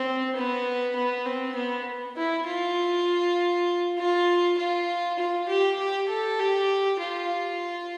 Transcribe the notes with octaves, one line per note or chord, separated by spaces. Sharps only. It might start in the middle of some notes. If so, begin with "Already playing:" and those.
Already playing: C4
B3
B3
C4
B3
E4
F4
F4
F4
F4
G4
G4
A4
G4
F4